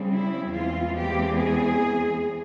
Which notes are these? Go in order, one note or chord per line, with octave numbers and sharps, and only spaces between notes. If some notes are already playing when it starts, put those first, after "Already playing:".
Already playing: C#3 G3 C4
E4
E2 E3 G#3 C4 F4
G4
G#4